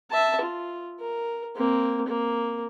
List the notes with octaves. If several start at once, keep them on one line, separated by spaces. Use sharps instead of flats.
E5 A5
F4
A#4
A#3 C4
A#3